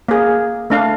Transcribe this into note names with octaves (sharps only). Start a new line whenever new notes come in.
A#3 G#4
A3 D4 F5